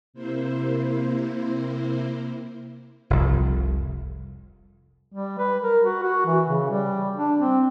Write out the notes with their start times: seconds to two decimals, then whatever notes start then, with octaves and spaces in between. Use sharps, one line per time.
0.13 C3 A#3 E4 C5
3.10 F1 C2
5.12 G3
5.39 B4
5.62 A#4
5.84 F#4
6.03 F#4
6.26 E3
6.47 C#3
6.71 G3
7.17 D4
7.39 C4